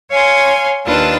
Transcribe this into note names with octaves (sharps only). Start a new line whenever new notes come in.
C#5 F5 G#5 C6
D#2 D4 F4 B4 A5